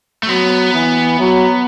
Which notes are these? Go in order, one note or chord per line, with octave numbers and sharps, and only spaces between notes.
A3
F#3 B3
E3
F#3